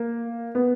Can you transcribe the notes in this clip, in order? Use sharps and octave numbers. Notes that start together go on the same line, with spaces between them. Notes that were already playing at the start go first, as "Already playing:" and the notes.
Already playing: A#3
B3